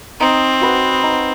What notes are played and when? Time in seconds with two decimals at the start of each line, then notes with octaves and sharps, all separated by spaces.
0.20 C4 D#4
0.61 F#4 B4 D#5
1.03 D#4